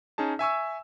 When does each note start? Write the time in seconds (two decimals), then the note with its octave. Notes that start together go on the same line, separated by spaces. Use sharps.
0.18 C#4 D#4 G#4 A5
0.39 E5 G#5 C#6 E6